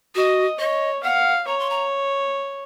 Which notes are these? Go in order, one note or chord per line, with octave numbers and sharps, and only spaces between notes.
F#4 D#5
C#5 D#5
F5 F#5
C#5 A#5
C6
A#5